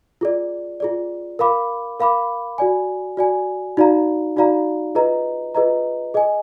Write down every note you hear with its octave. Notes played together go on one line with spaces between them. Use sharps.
F4 G#4 D5
F4 G#4 D5
A#4 F5 B5 D6
A#4 F5 B5 D6
F#4 D5 G#5
F#4 D5 G#5
D#4 F#4 D5 F5 A#5
D#4 F#4 D5 F5 A#5
F4 G#4 B4 D#5 A#5
F4 G#4 B4 D#5 A#5
G#4 D#5 G#5